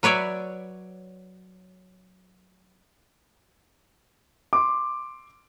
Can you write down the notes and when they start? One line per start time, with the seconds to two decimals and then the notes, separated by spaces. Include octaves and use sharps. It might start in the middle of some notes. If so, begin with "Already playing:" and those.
0.03 F#3 B4 C#5 D5 E5
4.53 C6 D6